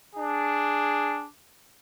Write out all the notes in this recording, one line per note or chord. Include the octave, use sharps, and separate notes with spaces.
D4 G#4